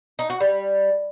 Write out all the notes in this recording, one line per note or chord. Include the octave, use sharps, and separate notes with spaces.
D#4
F#4
G3